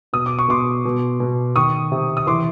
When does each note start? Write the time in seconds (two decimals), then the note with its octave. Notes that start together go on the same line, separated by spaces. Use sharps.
0.13 B2 D#6
0.26 D6
0.39 C#6
0.48 B2 C6 D6
0.85 B2
1.20 B2
1.55 D#3 C#6 D#6
1.92 C3
2.17 D#6
2.27 E3 C6 D6